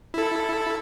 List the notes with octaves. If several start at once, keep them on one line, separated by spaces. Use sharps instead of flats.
E4 A4